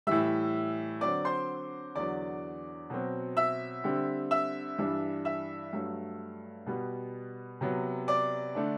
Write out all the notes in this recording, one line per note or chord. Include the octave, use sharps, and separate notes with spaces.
A2 E3 G3 E5 E6
D3 F#3 C4 D5 D6
C5 C6
E2 D3 F#3 D5 D6
B2 F#3 C4
E5 E6
D3 G3 C4
E5 E6
G2 E3 G3 D4
E5 E6
G2 F#3 A3
B2 G3 B3
C3 F#3 B3
D5 D6
D3 A3 D4